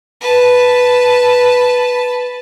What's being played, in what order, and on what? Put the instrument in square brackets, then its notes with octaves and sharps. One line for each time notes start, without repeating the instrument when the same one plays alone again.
[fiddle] B4 A5